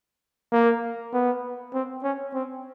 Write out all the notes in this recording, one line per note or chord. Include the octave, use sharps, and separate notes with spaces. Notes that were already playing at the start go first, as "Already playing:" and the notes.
A#3
B3
C4
C#4
C4